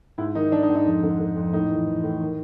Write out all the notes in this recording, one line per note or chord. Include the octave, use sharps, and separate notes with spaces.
G#2 E4
D#3 D#4
D#3 D4
D#4
G#2
D#4
F2
D3
D3
F2
A2 D#4
E3
E3
A2
D#3